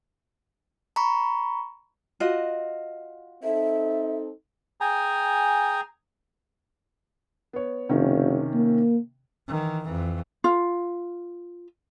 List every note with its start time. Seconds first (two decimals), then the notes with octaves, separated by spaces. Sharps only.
0.96 A#5 B5 C#6
2.20 F4 F#4 D#5
3.43 C4 D#4 A4 E5
4.81 G#4 G5 G#5 A#5
7.53 B3 C#5
7.89 F#1 C3 D#3 C#4
8.54 A#3
9.48 D#3 E3
9.83 F2 E3
10.44 F4